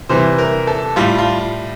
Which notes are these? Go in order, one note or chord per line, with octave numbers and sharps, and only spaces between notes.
C3 E3 G3 C5
A#4
A4
A2 G3 F4
F4